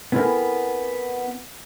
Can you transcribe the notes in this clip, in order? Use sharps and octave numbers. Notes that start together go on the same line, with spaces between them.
B3 C4 E4 A4 A#4 G#5